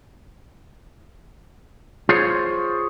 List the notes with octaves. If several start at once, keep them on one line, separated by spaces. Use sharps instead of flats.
F4 G#4 C5 C#5